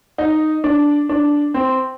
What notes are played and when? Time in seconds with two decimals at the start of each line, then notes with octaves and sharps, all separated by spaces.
0.18 D#4
0.64 D4
1.09 D4
1.54 C4